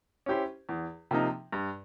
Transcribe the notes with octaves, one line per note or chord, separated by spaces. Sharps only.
C#4 E4 G4 C5
E2
C3 F3 A#3 D#4
G2